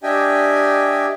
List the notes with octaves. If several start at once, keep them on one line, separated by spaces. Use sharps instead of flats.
D4 G4 D#5 E5 G5 G#5